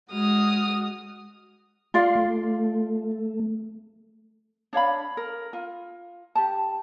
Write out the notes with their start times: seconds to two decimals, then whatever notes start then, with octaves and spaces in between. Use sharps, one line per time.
0.12 G#3 F#4 D#6 F6
1.94 F4 D5 F5 C6
2.15 A3
4.73 D4 C#5 F5 B5
5.17 A#4
5.53 F4
6.35 G4 A5